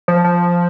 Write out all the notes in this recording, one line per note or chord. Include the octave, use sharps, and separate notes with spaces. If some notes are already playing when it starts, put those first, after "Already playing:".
F3
F3